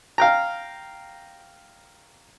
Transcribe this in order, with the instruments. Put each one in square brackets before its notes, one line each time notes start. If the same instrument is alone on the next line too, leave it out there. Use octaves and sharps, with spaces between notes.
[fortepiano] F5 G5 A#5